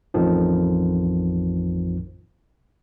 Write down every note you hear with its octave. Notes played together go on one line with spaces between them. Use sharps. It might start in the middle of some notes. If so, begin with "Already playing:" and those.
A1 F2 D#3 F3